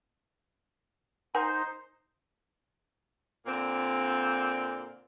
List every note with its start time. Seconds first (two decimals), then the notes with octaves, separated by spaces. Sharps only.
1.35 D#4 A#4 C5 F#5 G#5
3.46 A#2 D3 A#3 C4